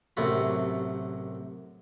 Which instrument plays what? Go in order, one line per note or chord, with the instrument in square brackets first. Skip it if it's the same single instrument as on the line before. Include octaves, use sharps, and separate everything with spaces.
[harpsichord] A1 F#2 C3 A3 B5